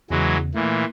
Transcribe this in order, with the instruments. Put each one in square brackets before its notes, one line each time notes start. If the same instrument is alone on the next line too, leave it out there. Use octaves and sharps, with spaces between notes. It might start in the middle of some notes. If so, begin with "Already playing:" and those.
[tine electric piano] E2 C#3 [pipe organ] E3 F#3 G#3
[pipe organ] A#2 E3 [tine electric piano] A3